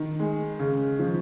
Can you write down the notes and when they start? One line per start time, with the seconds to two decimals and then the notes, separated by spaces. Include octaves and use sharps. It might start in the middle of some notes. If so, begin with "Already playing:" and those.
Already playing: D#3
0.19 G#3
0.59 C#3
0.99 F3